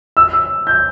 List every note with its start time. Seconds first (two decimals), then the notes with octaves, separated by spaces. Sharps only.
0.17 E6
0.33 E6
0.67 G6